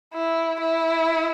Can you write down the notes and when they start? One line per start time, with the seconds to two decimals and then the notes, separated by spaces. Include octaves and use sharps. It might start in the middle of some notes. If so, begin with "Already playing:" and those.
0.14 E4
0.60 E4